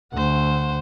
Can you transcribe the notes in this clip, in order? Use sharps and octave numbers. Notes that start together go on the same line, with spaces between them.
D2 C5 F#5